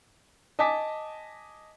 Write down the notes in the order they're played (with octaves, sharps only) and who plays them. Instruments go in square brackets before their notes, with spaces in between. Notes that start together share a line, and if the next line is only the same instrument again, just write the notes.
[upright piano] D#5 G#5 A5 D6 B6